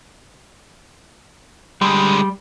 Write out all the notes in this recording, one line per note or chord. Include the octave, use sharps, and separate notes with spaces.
D3 G3 G#3